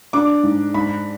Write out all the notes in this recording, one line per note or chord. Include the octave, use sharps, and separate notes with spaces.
D4 D6
G#2
G#2 B5